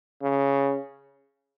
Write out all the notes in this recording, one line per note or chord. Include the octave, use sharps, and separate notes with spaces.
C#3